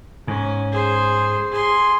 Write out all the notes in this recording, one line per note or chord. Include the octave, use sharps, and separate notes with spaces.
G#2 C#4
G#4 C5
G#4 C6